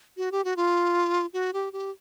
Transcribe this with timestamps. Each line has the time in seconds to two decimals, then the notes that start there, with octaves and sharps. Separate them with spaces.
0.17 F#4
0.32 G4
0.44 F#4
0.56 F4
1.33 F#4
1.53 G4
1.73 G4